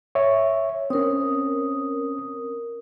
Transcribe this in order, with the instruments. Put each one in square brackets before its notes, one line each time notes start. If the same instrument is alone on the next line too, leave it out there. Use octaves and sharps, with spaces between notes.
[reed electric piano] C#5 E5
[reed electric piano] C4 C#4 [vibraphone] A#4 D#6